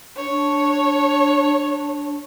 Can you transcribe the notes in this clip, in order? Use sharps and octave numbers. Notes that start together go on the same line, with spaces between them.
D4 C#5